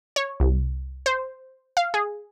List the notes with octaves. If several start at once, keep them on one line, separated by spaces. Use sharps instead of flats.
C#5
C2
C5
F5
G#4